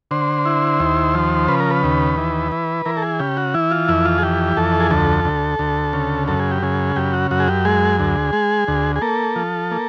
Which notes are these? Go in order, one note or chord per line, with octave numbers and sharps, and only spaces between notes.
D3 C5
E4
D#2
F3
C#3 B4
A#4
B4
D#2
E3
E3
E3 A#4
A4
G#4
C#3 G4
F#4
E3 E4
F4
F2 E4
F4
G#4
E3 G4
F2 A4
G#4
D2 A4
D2
D2
C#3
F#2 A4
G#4
G4
C#3 G#4
F#2 G4
F#4
F#2 F#4
G#4
G4
G#3 G#4
D2
G#3
D2
G#4
A#3 A4
F3
A#3